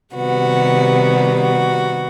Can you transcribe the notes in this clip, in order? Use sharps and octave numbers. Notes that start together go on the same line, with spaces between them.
C3 D#3 G3 B3 F#4
F#4